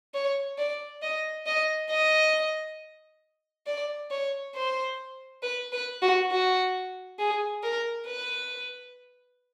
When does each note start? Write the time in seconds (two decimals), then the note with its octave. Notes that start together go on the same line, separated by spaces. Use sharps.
0.14 C#5
0.58 D5
1.03 D#5
1.46 D#5
1.91 D#5
3.67 D5
4.11 C#5
4.55 C5
5.43 B4
5.73 B4
6.02 F#4
6.32 F#4
7.19 G#4
7.63 A#4
8.07 B4